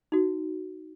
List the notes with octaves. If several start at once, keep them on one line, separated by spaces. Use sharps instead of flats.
D#4 F#4